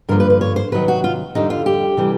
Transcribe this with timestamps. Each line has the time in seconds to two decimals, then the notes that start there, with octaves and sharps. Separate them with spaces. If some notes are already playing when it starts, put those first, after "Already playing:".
0.09 G2 D3 F3 A#3 A#4
0.20 B4
0.30 B4
0.41 C#5
0.56 C5
0.72 C3 D#3 F#3 B4
0.88 F#4
1.04 F4
1.35 F2 D3 G3 D#4
1.50 F4
1.66 G4
1.97 C3 E3 G3